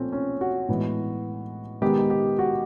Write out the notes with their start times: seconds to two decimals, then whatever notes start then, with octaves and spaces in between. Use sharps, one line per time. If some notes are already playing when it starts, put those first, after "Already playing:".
Already playing: A#2 F3 A3 C4 C#4
0.12 C#4
0.41 F#4
0.69 A2 E3 G#3 B3
1.82 D#3 G#3 B3 G4
2.10 G4
2.39 F#4